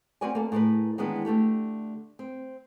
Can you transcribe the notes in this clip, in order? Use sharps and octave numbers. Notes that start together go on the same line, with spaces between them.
C4 C#4 F#4 B4 D5 G#5
A#3 A4
A2 G#4 A#4 B4
D#3 E3 G#3 B3 D4
D3 A3 G4 A4
C4